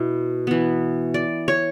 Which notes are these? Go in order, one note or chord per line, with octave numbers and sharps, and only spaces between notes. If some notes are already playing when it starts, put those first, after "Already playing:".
Already playing: B2 E4
E3 B3
D5
C#5